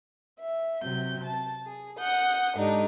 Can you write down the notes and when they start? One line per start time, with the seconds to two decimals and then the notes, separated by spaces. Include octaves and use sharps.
0.39 E5
0.82 C3 F#3 G6
1.23 A5
1.66 G#4
1.99 F#5 D#6 G6
2.56 G#2 D3 D4 D#4 G4